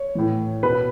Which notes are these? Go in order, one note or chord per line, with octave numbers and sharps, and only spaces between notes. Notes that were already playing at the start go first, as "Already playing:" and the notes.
Already playing: C#5
A2 E3
B2 B4 B5